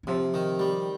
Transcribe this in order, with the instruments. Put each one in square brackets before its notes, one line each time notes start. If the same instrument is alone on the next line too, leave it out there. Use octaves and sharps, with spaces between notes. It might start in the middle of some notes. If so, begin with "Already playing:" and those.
[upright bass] D#3
[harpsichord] C3 [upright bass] F3
[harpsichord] D#3
G3